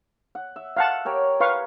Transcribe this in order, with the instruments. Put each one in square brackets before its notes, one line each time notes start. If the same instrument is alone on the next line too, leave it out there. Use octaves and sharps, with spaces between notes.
[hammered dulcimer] F#5
E5
[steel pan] F5 F#5 A5
[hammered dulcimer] G4 A#4 C#5
[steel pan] B4 F5 C#6